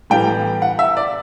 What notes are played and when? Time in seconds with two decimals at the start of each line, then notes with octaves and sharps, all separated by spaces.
0.10 A2 E3 G3 B3 G5
0.62 F#5
0.79 E5
0.97 D5